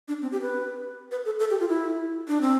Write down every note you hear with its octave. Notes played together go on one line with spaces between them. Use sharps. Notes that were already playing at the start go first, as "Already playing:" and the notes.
D4
C4
G4
B4
B4
A4
A4
G4
F4
E4
D4
C4